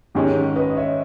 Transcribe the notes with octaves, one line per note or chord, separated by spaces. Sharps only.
G#2 D#3 G#3 C#4 D#4 G4
B4 D#5
D#5
C#5 E5